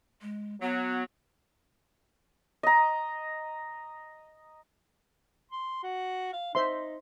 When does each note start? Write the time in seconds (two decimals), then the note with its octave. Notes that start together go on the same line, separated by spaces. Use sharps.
0.22 G#3
0.61 F#3 B3
2.63 D#5 A#5
5.51 C6
5.83 F#4
6.33 F5
6.55 D#4 C5 E5 C6